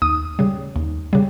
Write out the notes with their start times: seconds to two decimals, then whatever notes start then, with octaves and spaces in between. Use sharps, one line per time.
0.02 D#2 D#6
0.39 C#3 G3
0.76 D#2
1.13 C#3 G3